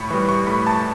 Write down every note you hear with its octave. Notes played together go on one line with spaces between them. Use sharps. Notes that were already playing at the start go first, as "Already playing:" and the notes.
Already playing: A2 B5 C#6
E3 G3
C#6
A2 B5
A5